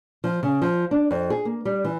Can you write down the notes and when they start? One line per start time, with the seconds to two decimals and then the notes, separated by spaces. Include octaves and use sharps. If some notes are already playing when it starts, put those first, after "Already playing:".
0.24 F3
0.43 C#3
0.62 F3
0.91 D4
1.11 F2
1.30 G#4
1.45 A#3
1.65 G3
1.84 E3